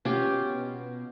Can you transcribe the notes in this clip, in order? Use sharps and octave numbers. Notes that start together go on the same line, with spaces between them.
B2 C#4 F4 G4